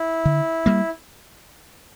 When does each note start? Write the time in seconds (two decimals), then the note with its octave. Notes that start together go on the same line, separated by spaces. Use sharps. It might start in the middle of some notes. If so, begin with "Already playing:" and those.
Already playing: E4
0.25 D3
0.66 G3 A#3